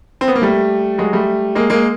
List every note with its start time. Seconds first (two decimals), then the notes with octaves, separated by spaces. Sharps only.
0.21 C4
0.28 B3
0.35 A#3
0.42 G3 A3
0.98 F#3 G#3
1.13 G3 A3
1.55 G#3 A#3
1.70 G#3 A#3